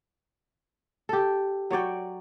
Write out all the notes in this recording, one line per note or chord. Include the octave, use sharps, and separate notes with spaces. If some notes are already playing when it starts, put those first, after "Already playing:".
G4 A4
F#3 C#5 D5 G5